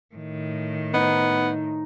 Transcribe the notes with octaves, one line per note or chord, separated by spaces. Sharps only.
A2 D#3
B3 D#4